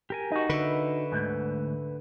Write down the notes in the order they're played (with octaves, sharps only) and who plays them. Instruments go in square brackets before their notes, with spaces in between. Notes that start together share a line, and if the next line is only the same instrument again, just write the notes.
[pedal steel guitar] G4 A#4 G#5
[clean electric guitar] D#4 F#4
[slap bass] D3 [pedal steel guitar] B4 E5
[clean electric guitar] D2 G#2